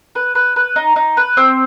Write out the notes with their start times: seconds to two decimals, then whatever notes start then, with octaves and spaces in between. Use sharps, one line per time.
0.15 B4
0.35 B4
0.56 B4
0.76 D#4
0.96 D#4
1.17 B4
1.37 C4